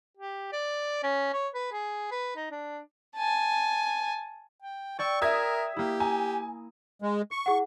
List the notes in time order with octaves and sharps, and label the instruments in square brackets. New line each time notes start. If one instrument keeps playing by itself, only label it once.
[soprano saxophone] G4
D5
C#4
C#5
B4
G#4
B4
D#4
D4
[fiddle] G#5 A5
[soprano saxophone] G5
[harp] D5 G5 E6 [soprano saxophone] C#6
[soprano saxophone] A#4 [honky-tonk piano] E5 D#6 G#6
[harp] A#3 E4 [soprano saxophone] G4
[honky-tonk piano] G#5 [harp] A#5
[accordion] G#3
[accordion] C#6 [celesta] C#7
[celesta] E4 G#4 F#5